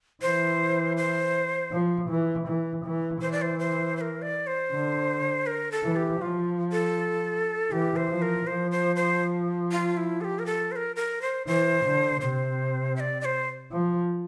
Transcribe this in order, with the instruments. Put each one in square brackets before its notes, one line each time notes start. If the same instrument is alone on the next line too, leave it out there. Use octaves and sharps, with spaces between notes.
[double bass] E3 [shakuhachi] C5
[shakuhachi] C5
[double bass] F3
E3
E3
E3
[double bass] E3 [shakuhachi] C5
[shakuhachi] D5
C5
C5
C5
A#4
D5
C5
[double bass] D3
[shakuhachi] A#4
A4
[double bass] E3
[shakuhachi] G4
[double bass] F3 [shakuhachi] F4
[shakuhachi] A4
[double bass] E3 [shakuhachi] G4
[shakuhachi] C5
[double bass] F3
[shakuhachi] A#4
[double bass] F3 [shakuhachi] C5
[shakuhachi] C5
C5
F4
E4
A4
G4
A#4
A4
C5
A#4
A#4
C5
[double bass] E3 [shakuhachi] C5
[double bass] D3
[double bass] C3 [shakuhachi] C5
[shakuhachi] E5
D5
D5
C5
[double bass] F3